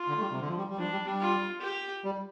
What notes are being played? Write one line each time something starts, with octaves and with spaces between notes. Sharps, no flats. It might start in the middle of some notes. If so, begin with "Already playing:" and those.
Already playing: F4
D3
A3
G3
C3
D3
F3
G3
G3
F3 D4
G3
G3
F4
G4
G3